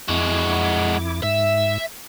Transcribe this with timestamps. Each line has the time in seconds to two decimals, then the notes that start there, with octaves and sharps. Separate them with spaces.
0.09 F2 G#3 E4 F#4 D6
1.23 G#2 E5